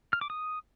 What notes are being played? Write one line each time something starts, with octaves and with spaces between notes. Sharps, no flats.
F6
D6
D#6